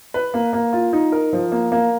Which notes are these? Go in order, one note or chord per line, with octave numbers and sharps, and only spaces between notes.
B4
A#3
A#3
F4
D#4
A#4
F3
A#3
A#3